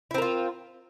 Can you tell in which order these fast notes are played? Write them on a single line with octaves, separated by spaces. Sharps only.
E4 C4 A#4 F4